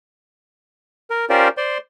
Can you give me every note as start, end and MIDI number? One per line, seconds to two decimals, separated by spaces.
1.10 1.25 70
1.30 1.48 61
1.30 1.48 65
1.30 1.48 67
1.30 1.48 70
1.30 1.48 72
1.30 1.48 74
1.57 1.78 72
1.57 1.78 74
1.57 1.78 84